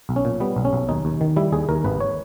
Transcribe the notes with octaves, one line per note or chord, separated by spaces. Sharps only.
B1
C#4
A#2
G3 B3
B1
C#4
B1
D#2 D#4
D#2
D#3
G3 E4
D#2 G#4
D#2 A#4
G#1 B4
C#5